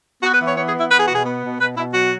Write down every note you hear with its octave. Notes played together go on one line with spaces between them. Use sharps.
B3 F#4
B4
E3
C#5
B3 C#5
G#4
E3 E4
B3 B4
G#4
B2 F#4
G#4
B3
B2
B2 B4
B2 E4
F#3 F#4